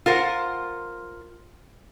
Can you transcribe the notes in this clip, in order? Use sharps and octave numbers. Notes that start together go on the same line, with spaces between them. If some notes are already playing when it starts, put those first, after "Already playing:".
F4 A#4 C5 F#5